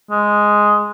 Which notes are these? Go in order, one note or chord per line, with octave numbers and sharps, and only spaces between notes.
G#3